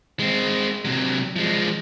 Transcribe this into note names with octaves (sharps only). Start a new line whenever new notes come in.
G#3 C4
C3 F#3
F3 G#3